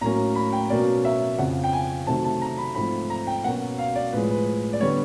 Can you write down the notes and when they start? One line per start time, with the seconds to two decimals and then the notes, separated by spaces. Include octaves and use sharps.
0.01 A2 F#3 A#3 C#4 A#5
0.35 B5
0.53 G5
0.70 B2 F#3 A#3 C#4 D5
1.05 E5
1.38 F2 C#3 F3 F#5
1.64 G5
1.73 G#5
2.07 C3 D#3 F#3 A3 C4 A5
2.24 A5
2.42 A#5
2.58 B5
2.75 G#2 F3 A3 C4 B5
3.10 A#5
3.27 G5
3.44 B2 F#3 A#3 C#4 F#5
3.78 F5
3.96 D5
4.13 A2 F3 G#3 B4
4.30 B4
4.73 D5
4.81 D3 G3 B3 C#5